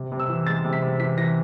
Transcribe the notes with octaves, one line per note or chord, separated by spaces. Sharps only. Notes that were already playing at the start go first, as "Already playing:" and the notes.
Already playing: C3
C3
E6
E3
G#3 A6
C3
B6
C3
E3 B6
E3 A#6